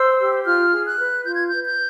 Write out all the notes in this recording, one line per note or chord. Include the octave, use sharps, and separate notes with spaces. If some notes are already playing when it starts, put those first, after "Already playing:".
Already playing: C5 E6
G4
F4 F6
G#4
F#6
B4
F4 G6
G#6
B4 G6
G6